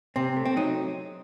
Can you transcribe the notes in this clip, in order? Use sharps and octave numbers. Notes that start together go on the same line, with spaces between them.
C3 C4
A3
C4
F#3 D#4